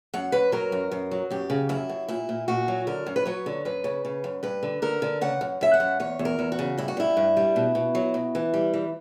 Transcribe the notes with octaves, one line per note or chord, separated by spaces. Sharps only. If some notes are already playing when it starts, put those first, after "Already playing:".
F#2 F#5
F#2 B4
F#3 A#4
F#2
F#2
F#3
F#2 G4
C#3
F#2 E4
F#2
A#2 E4
A#2
A#2 F#4
F#3
D3 A#4
F#2
B4
F#3 C#5
D3
F#2 B4
C#3
C#3
F#2
G2 B4
D3
D3 A#4
D3
C#3 F#5
F#2
F#2 E5
F#5
F#2
E2 C#5
E2
A#4
E2
F#4
C#3
G2 E4
F#4
G3 E4
G2
G3
B2
B2
F#3
B2
E3
G3
E3